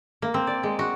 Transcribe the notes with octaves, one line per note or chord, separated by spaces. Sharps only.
A#3
C4
D5
G#3
F#4